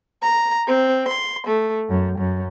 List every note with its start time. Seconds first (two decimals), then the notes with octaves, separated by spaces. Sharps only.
0.22 A#5
0.68 C4
1.09 C6
1.47 A3
1.89 F#2
2.19 F#2